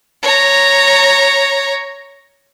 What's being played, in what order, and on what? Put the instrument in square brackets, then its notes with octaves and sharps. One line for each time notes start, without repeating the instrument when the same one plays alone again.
[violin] C#5 A#5